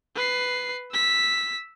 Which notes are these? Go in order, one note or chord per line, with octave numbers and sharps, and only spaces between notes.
B4 C7
E6 B6